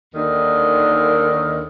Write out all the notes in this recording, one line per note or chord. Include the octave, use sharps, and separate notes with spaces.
D#2 D3 D#3